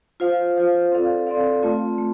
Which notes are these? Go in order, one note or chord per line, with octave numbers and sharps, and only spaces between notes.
F4 C5 F5
F4 C5 F5
C4 A4 D5 F5
C4 A4 D5 F5
A3 C4 F4
A3